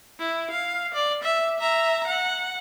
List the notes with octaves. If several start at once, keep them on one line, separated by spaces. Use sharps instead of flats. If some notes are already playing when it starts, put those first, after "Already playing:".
E4
F5
D5
E5
E5 A#5
F#5